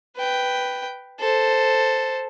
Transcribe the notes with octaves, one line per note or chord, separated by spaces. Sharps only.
B4 G5
A4 C5